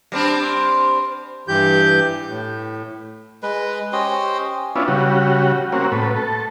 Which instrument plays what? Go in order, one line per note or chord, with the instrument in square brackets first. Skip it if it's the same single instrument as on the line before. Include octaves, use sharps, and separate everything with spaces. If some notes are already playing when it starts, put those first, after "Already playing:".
[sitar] G3 C4 D4
[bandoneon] G2 E3 G4 G6
A2
[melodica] G#3 B4
C#4 G4 C5 D#5
[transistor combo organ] B3 C#4 D4 E4 F4
C#3 G3 F#4
A#3 C4 C#4 F#4
A2 B4
A4